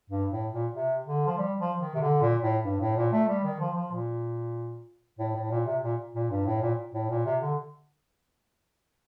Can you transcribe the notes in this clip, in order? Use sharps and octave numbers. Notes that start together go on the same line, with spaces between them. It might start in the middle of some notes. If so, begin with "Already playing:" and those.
G2
A2
A#2
C3
D3
F3
G3
F3
D#3
C3
D3
A#2
A2
G2
A2
A#2
A3
G3
D#3
F3
F3
A#2
A2
A2
A#2
C3
A#2
A#2
G2
A2
A#2
A2
A#2
C3
D3